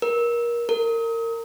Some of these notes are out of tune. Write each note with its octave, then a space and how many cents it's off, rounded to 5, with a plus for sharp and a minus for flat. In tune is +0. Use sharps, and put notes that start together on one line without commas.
A#4 +25
A#4 -25